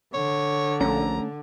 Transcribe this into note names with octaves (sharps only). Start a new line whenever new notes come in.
D3 C#5
A#1 A3 B3 C#4 A#5